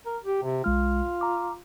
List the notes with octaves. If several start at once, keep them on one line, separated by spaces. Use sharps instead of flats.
A#4
G4
C3
B1 G#3 F4 F6
A#5 D6